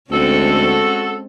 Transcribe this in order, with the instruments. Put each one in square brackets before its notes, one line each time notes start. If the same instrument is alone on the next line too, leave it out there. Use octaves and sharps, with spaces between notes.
[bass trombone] D2 [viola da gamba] G#3 C4 C#4 [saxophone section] F#4 A4